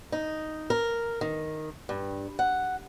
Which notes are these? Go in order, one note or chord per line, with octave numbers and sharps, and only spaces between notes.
D#4
A#4
D#3
G2
F#5